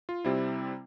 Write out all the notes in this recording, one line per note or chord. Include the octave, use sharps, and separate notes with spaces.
F4
C3 G3 C4 E4